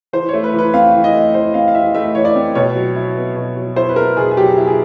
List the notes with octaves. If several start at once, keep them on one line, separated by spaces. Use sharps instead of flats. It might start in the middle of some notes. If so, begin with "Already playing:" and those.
E3 C5
A3 C#5
B4
E3
B4
C4 F5
E3
D#5
A3
E3 C5
C4 F5
F5
E3 E5
A3 E5
E3 C#5
D5
C4
B2 C#5
F#3
E4
B3
B2
F#3
E4 C5
B4
B3 A#4
B2 G#4
G#4
F#3 G4
E4
G#4